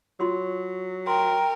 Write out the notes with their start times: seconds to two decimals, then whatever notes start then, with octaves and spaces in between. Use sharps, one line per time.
0.20 F#3 F4 C6 E6
1.07 A#4 G5 C6